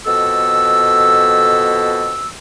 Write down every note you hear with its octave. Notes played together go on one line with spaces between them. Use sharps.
F2 B2 A4 E6